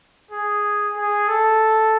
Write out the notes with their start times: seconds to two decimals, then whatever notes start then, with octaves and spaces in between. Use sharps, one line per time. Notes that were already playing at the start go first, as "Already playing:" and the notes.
0.31 G#4
0.96 G#4
1.28 A4